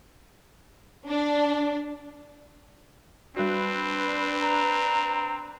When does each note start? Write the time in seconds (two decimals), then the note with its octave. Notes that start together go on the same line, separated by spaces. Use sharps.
1.08 D4
3.36 G3 C4 D4 F#4 B4
4.41 A#5